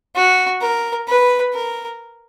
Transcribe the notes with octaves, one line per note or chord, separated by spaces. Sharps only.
F#4
A#4
B4
A#4